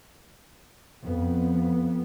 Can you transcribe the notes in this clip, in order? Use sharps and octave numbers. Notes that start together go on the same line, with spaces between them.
F2 B3